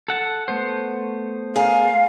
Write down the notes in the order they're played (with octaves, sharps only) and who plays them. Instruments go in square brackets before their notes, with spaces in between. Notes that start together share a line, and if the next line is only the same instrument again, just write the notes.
[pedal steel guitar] A4 F#5 A5
A3 B3 C5
[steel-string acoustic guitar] G#4 A#4 [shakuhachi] F5